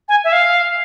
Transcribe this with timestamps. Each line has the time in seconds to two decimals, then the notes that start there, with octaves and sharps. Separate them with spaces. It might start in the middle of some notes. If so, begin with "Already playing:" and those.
0.09 G#5
0.24 E5
0.32 F5